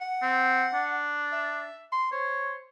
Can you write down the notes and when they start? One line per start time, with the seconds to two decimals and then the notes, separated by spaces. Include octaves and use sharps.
0.01 F#5
0.22 C4
0.74 D4
1.32 E5
1.92 C6
2.12 C5 C#5